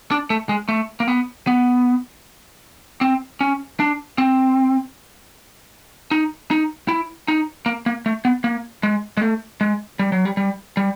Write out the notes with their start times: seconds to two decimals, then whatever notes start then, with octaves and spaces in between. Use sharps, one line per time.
0.11 D4
0.30 A3
0.49 G#3
0.69 A3
1.00 A#3
1.08 B3
1.47 B3
3.01 C4
3.41 C#4
3.80 D4
4.18 C4
6.11 D#4
6.51 D#4
6.88 E4
7.28 D#4
7.66 A#3
7.86 A#3
8.06 A3
8.25 B3
8.44 A#3
8.83 G#3
9.17 G#3
9.21 A3
9.61 G#3
9.99 G3
10.12 F#3
10.25 G3
10.37 G3
10.77 G3